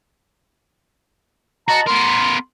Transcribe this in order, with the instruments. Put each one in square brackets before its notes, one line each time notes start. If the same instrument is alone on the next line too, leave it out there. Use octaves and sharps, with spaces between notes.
[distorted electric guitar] F#4 [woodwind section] D#5 A5 A#5
[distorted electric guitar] B3 A#4 [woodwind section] C6